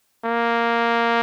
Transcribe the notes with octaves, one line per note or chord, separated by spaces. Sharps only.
A#3